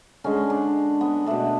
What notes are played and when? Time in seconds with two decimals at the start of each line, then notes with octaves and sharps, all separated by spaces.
0.24 D3 G#3 C#4
0.50 D4
1.01 B3
1.26 B2 A3 D4